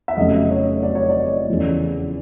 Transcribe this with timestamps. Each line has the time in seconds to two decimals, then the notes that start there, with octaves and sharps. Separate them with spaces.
0.08 E5
0.17 F1 F2 C#3 F#3 A3 D#5
0.51 C#5
0.83 D5
0.95 C#5
1.09 D5
1.48 E2 C#3 F3 A3